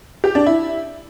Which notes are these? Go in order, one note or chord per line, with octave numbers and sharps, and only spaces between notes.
G4
D4
E4